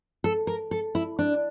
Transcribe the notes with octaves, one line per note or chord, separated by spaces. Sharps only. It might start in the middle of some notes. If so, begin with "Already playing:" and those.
A4
A#4
A4
E4
D4